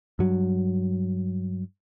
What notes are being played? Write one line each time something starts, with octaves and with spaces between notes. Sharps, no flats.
G2 F#3